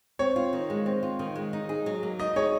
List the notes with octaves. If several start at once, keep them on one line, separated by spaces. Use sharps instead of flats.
C4 C#5
F4
D#3
G#3
C4
F4
D#3
G#3
D#4
G#4
F#3
A#3
D#4 D#5
G#4 C#5